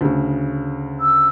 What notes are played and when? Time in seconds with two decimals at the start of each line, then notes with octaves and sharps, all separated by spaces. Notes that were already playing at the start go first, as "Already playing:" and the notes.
0.01 D2 C#3
1.01 E6